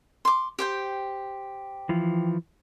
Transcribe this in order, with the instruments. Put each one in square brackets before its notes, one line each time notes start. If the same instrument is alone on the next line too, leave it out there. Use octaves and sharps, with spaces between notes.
[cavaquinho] C6 D6
G4 C5 G5
[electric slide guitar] E3 F3